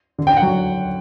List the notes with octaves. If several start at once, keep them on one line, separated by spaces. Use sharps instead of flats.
D3
G5
F#5
F#3